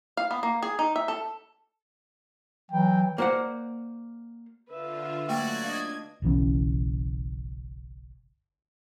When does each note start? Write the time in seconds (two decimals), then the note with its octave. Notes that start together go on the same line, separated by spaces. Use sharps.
0.17 F5
0.31 B3
0.43 A#3
0.63 G#4
0.79 D#4
0.96 E5
1.08 A4
2.72 E3 F#3 G5
3.18 A#3 F#4 C5 D5 F#5
4.68 D3 F4 B4 E5
5.29 F#3 A3 A#3 F#4 D5 G5 G#6
5.64 D4 D#5 F5
6.22 F#1 B1 E3 C#4